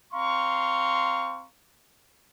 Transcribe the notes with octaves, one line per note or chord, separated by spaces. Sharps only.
C4 F5 A#5 C6 C#6